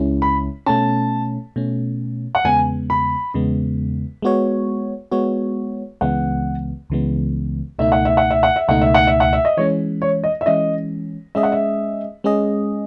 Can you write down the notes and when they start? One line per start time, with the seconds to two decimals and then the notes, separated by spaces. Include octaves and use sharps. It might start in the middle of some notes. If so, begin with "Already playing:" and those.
Already playing: C#2 C#3 G#3 C#4 E4
0.22 B5
0.66 B2 A3 C#4 A5
1.56 B2 A3 C#4
2.35 F#5
2.44 E2 C#3 G#3 B3 G#5
2.90 B5
3.34 E2 C#3 G#3 B3
4.22 G#3 B3 F#4 C#5
5.12 G#3 B3 F#4 C#5
6.01 C#2 C#3 E3 G#3 B3 F#5
6.90 C#2 C#3 E3 G#3 B3
7.79 C#2 B2 A3 D#4 E5
7.92 F#5
8.05 E5
8.17 F#5
8.31 E5
8.43 F#5
8.56 E5
8.68 C#2 B2 A3 D#4 F#5
8.82 E5
8.94 F#5
9.07 E5
9.20 F#5
9.33 E5
9.45 D#5
9.57 E3 G#3 C#4 C#5
10.02 C#5
10.24 D#5
10.41 E5
10.46 E3 G#3 C#4 D#5
11.35 G#3 C#4 G#4 D#5 E5
11.43 F#5
11.52 E5
12.24 G#3 C#4 G#4 D#5